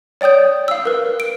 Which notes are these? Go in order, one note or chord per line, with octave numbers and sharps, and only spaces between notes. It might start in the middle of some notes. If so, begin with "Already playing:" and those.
C#5 D5 G5 D#6 G6
F5 E6
A#4 B4
D7